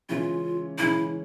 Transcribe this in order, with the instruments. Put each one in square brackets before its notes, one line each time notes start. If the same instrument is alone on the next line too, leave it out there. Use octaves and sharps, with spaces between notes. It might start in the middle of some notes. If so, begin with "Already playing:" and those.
[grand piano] C#3 E3 G#3 C#4 [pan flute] F4
[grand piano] C#3 E3 G#3 C#4 [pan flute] E4